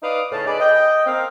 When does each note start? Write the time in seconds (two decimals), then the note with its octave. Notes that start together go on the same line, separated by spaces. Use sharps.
0.03 D#4 B4 D5 F5 D6 D#6
0.32 A2 C#3 A5
0.46 D#4 G#4 B4 D5
0.60 D#5 G5
1.06 C4 A#4 F5